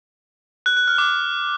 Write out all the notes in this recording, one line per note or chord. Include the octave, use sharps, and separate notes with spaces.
F#6
F#6
F6
D6